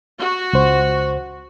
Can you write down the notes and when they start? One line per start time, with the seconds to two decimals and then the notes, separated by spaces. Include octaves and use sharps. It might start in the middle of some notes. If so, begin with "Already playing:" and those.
0.17 F#4
0.53 C#2 C5